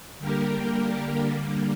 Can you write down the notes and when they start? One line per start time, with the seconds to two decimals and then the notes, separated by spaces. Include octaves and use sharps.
0.19 D3 G3 A#3 G4 A#4
1.19 D3 G3 A#3